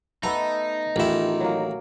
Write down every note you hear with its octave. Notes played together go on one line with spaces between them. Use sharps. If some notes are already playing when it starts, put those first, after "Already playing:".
A3 B3 D#4 A4 A#5
A1 D#3 E4 F4
F#3 A#3